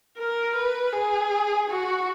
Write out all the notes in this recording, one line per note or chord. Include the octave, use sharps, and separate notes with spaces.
A#4
B4
G#4
F#4